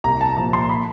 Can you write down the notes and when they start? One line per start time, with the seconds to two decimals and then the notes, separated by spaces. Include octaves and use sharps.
0.04 C2 A#5
0.21 A5
0.37 A#2 F3 A#5
0.53 C6
0.69 B5